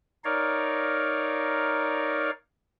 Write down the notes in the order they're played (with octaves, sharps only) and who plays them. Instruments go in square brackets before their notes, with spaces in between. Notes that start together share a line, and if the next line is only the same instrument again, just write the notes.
[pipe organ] D#4 A#4 C#5 D5 F5